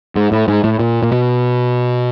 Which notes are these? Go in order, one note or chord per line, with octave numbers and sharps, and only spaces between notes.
G#2
A2
G#2
A2
A#2
A#2
B2